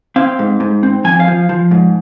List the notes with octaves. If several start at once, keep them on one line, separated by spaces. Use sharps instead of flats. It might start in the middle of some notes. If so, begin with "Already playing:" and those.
C4 F5
G#2
G#2
C4
F3 G#5
F5
F3
F3
G#2